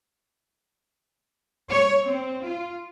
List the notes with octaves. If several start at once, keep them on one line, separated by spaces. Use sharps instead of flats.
C#5
C4
F4